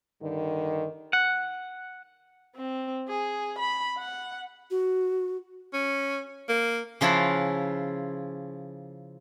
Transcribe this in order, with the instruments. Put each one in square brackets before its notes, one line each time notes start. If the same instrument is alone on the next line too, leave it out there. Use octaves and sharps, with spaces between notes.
[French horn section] G2 D3 D#3
[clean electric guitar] F#5
[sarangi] C4
G#4
B5
F#5
[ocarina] F#4
[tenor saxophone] C#4
A#3
[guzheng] C#3 F3 E4 F4 F#5